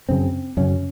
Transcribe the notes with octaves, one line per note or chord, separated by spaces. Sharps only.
F#2 C#3 C4
F#2 C#3 C#4